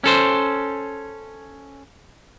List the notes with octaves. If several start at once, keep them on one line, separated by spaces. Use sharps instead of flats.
C#4 A4 C5